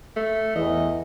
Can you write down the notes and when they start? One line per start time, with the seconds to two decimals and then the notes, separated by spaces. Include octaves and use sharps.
0.16 A3
0.56 E2 E3 D#5